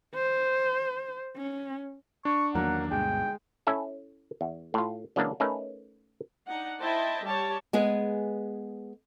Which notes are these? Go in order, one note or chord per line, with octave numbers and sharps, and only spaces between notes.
C5
C#4
D4 C#6
E2 D#3 F#3 A#3 F#5
D2 G2 B2 G#3 G5
C#4 E4 A4 E5
E2
A2 F4
C#3 E3 F#3 G#3 A#3 D4
A3 C#4 D#4 A#4 B4
D4 D#4 F#5
E4 C5 D#5 E5 G5 A5
G3 G4 C#5 A5
G#3 B3 G#4